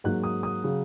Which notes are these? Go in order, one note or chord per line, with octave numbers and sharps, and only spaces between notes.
G#2 F#3 A#3 F#6
D#6
D#6
C#3 F#3